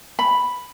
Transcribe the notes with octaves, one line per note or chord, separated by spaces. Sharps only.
B5